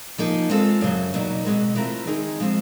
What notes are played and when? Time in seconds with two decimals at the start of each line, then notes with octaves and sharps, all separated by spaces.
0.18 F3 A#3 D#4 G#4
0.50 G#3 C4 F4 A4
0.81 F#2 C#3 F#3
1.14 E2 B2 F#3 A#3 D#4
1.45 B2 G#3 C4
1.76 E3 A3 C4 F4 A#4
2.07 D#3 G#3 C4 D#4 G#4
2.40 F3 G#3 C4